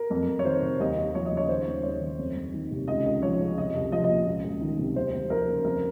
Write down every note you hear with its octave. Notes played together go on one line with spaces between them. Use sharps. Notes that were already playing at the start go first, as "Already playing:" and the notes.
Already playing: A#4
F2
F2
C#5
D#3 C5
C3
D#2 D#5
D#2
F3 C#5
D#5
C#3
C#5
D#3 C5
D#2
D#2 C#5
D#3
F2
F2
D#3
C3
C#2 D#5
C#2
F3 C#5
C#3
C2 D#5
C2
F3 D#5
D#5
A#2
C#2
C#2
D#3
C3
D#2 C5
D#2
F3 A#4
C#3
F2 A#4